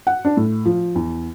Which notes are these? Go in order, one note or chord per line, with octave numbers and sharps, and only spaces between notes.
F#5
D4
A2
F3
E2